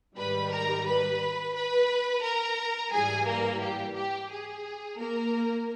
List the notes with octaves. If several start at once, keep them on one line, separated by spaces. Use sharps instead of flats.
G#2 D#3 G3 B4 B5
A#4 A#5
B4 B5
B4 B5
A#4 A#5
G#2 E3 G3 G#4 G#5
A#3 A#4
G4
G4
G#4
A#3 A#4